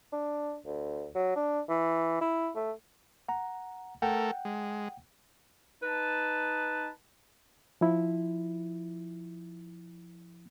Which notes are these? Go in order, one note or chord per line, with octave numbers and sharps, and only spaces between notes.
D4
D2
F#3
D4
E3
E4
A3
F#5 A#5
A3 A4 A#4 F#5 G5
G#3
D#4 B4 A5
F3 E4